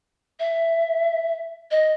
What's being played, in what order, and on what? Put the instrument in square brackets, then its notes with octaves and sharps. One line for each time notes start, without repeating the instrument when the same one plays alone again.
[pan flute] E5
D#5